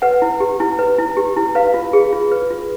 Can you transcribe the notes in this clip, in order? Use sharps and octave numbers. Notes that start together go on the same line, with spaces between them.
B4 F#5
E4
G4
E4
B4
E4
G4
E4
B4 F5
F4
G#4
F4
B4
F4